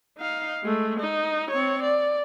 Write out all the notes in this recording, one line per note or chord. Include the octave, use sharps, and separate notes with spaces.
D#4 F5
G#3 A3
D#4
C4 C#5
D5